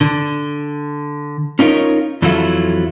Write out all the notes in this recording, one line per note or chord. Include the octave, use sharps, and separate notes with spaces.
D3
C#4 D#4 F4 A#4 C#5
F2 E3 F#3 E4 F4 A4